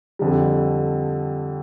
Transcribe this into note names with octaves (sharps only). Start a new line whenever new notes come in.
F2 D3 G3